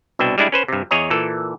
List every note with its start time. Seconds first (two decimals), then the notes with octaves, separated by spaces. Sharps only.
0.19 C2 B2 D4 E5 G5
0.38 G3 G#3 D4 E4
0.52 C#4 B4 C5
0.68 G2 C3
0.91 E2 G#4 C#5 D#5 A#5
1.10 A#2 E3 A4